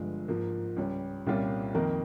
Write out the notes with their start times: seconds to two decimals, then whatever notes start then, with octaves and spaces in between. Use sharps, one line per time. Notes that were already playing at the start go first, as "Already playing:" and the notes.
Already playing: G1 G2 F3 G#3
0.28 G#2 F3 A#3
0.77 C#2 C#3 G3 C#4
1.26 C2 A#2 G3 C#4 F4
1.75 F2 D#3 A#3 D#4 A#4